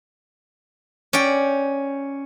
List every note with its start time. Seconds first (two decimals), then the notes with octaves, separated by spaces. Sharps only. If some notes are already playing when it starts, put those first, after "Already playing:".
1.13 C#4 D5 G5